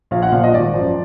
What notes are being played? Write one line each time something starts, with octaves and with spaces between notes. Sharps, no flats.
A#1 F5
F#5
A#2 F3 F5
D#5
G#1 D5
F#2 F3